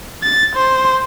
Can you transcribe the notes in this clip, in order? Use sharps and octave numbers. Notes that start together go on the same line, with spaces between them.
A6
C5